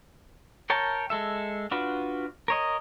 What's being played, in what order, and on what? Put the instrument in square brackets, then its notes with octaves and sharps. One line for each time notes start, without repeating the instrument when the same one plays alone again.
[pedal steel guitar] A#4 C#5 G5 A5
G#3 A4 E5
D4 F4 F#4 B4
A#4 C#5 D#5